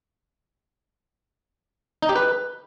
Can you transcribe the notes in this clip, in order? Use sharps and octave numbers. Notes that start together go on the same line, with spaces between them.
D#4
G4
B4